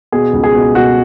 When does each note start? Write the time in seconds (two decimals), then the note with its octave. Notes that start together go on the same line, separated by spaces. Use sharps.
0.12 B2 G#4
0.33 C#2
0.44 G#4
0.55 B2
0.75 B2 F#4